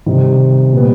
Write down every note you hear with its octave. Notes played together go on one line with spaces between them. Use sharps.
C3 D#3 G3 C4 D#4
A#2 G3 B3